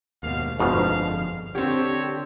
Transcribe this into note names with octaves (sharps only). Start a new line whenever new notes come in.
D#2 G#2 B2 F5
G1 F2 G#2 B2 D3 F3 F5
D3 C4 G4 C#5